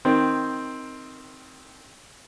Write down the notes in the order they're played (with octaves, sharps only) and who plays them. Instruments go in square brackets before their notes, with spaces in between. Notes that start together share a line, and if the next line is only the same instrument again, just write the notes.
[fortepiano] D#3 C4